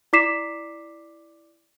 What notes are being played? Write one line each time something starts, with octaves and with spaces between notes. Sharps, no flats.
E4 D5 D6 B6 C7 E7